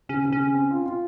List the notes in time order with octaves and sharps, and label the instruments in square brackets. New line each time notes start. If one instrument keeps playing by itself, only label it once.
[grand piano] C#3 [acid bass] C#4
[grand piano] C#3
[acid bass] C#4
[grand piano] C#3
C4
F4
F4